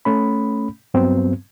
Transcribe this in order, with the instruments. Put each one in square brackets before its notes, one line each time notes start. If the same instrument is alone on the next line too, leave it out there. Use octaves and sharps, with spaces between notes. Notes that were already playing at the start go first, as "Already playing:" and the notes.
[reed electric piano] A3 C#4 B5
G2 F#3 B3 C4